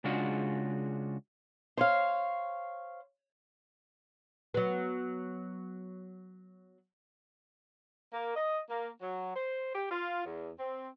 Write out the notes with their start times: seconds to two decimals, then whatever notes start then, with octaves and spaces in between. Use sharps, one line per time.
0.04 C#3 G#3 D4 F4 F#4
1.77 C5 C#5 F5
4.54 F#3 B3
8.13 A#3
8.36 D#5
8.70 A#3
9.01 F#3
9.36 C5
9.75 G4
9.91 F4
10.26 E2
10.59 C4